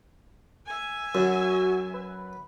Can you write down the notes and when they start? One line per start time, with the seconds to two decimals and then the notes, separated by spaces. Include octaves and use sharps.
0.66 E5 G#5
1.15 F#2 F#4
1.94 B4